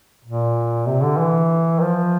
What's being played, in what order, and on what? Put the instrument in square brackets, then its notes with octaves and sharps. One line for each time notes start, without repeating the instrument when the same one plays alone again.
[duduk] A#2
C3
D3
E3
F3